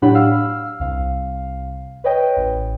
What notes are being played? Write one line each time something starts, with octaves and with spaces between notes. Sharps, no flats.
A2 F#3 D4 G4 F#5 B5
F5 E6 F6
C2 F5
B4 C#5 D#5 G5
A1